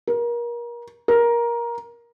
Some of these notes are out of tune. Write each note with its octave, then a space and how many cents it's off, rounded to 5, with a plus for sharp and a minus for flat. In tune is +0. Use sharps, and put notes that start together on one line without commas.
A#4 +30
A#4 +15